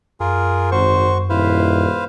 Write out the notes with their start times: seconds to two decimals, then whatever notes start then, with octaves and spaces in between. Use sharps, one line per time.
0.20 F#2 F4 G#4 A#4
0.72 G#1 F#4 C5 C#6
1.30 D#1 E4 B4 C5 F5